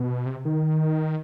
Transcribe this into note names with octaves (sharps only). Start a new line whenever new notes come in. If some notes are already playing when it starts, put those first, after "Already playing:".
Already playing: B2
C3
D#3